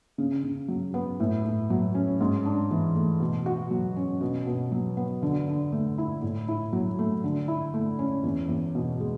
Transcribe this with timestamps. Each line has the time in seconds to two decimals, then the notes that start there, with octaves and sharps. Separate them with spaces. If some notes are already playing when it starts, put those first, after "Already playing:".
0.18 C#3
0.43 C#3
0.68 F#3
0.94 B3
1.20 A2
1.45 A2
1.70 F#3
1.95 C#4
2.20 G#2
2.45 D4
2.71 E3
2.95 A3
3.20 B2
3.46 F#4
3.71 F#3
3.96 C#4
4.21 B2
4.47 B2
4.72 F#3
4.97 B3
5.23 D3
5.48 D3
5.72 A3
5.98 E4
6.22 A2
6.48 E4
6.73 F#3
6.99 A3
7.24 D3
7.48 E4
7.74 A3
7.99 C#4
8.24 E2
8.49 E2
8.75 B2
9.00 G#3